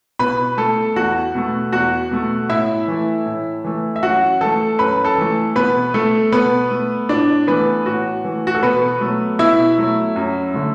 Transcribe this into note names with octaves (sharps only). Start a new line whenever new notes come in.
B2 B4 B5
A3 A4 A5
E2 F#4 F#5
B2 A3
E2 F#4 F#5
B2 A3
A2 E4 E5
E3 A3
A2
E3 A3
E5
F#2 F#4 F#5
E3 A3 A4 A5
F#2 B4 B5
A4 A5
E3 A3
B2 B3 B4
A3 A4
B2 B3 B4
A3
A2 D4 D5
E3 A3 B3 B4
A2 F#4
E3 A3
F#4
A4
B2 B3 B4
F#3 A3
B2 E4 E5
F#3 A3
F#2
D3 F#3 A3